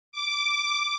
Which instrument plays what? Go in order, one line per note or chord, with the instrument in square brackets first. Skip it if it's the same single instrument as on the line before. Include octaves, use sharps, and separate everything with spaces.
[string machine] D6